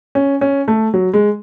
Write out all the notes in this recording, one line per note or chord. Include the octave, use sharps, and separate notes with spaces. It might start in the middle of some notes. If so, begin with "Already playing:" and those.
C#4
C#4
A3
F#3
G#3